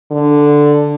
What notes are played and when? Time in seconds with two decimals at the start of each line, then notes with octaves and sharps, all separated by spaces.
0.11 D3